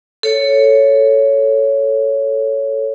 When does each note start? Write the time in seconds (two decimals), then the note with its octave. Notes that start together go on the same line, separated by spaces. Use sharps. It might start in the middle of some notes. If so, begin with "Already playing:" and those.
0.23 A4 C#5